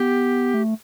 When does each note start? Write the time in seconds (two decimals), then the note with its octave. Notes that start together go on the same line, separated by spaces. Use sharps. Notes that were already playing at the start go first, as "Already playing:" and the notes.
Already playing: B3 G4
0.54 A3